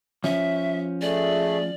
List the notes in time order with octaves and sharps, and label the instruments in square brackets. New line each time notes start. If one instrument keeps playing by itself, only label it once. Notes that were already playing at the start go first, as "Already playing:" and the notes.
[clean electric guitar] F3 C#4 [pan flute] E5
[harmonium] A3 G#4 [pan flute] D5